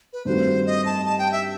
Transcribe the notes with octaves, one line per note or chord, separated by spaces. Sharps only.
B4
G2 D#3 A3 C4 F#4 C5
D#5
A5
A5
G5
E5